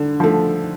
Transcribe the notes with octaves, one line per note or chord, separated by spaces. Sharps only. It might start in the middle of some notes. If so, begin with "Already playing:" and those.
Already playing: D3
F3 A3